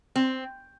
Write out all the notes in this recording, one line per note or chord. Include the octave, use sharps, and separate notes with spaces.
C4